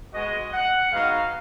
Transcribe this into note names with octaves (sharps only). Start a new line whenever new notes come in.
G#3 B3 F#4 D#5
F#5
G#3 B3 D#4 F#4 F5